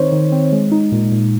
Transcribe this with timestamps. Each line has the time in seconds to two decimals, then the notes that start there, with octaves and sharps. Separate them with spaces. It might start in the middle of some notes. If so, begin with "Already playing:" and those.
Already playing: D#3 C4 D#4 C5 C#5
0.12 D#3
0.32 C4
0.52 G#3
0.72 D#4
0.92 A#2
1.12 A#2